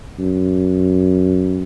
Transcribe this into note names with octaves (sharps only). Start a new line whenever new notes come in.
F#2